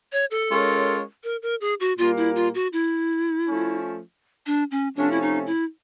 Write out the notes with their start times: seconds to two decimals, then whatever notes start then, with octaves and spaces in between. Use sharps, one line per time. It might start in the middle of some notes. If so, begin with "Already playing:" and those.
0.12 C#5
0.31 A4
0.50 G#3 C#4 F4 A#4 C#5
1.24 A#4
1.42 A#4
1.61 G#4
1.80 F#4
1.98 A#2 G3 A#3 F4
2.17 E4
2.36 F4
2.55 F#4
2.73 E4
3.47 F3 A3 C#4
4.46 D4
4.71 C#4
4.96 C3 F3 A3 C#4 D4
5.11 E4
5.22 D#4
5.46 E4